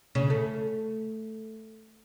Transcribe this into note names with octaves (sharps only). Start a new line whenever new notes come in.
C#3
A3